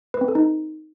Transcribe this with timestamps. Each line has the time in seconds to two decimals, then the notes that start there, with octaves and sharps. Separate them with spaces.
0.14 B4
0.21 C4
0.28 A4
0.35 D#4